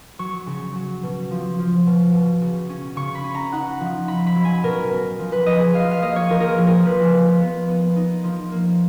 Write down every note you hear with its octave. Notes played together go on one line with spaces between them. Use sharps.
F#3 C#6
C#3
F#3
B2
F3
F3
B2
B2
C#3
C#4
C#3 C#6
B5
C#4
A#5
D#4 F#5
F3
D#4 B5
B5
F#3
G#5
B2 A#4
B2
F3
B4
F3 D#5
G#4
F3 F5
F5
A#3 D#5
C#5
F3 A#4
A#4
G#4
F3
A#4
F3 B4
F3
B3
B3
D#4
F3
A#3